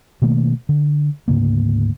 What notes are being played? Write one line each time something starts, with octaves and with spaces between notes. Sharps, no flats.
B2 D#3 A3 A#3
D3
D2 G#2 C#3 A#3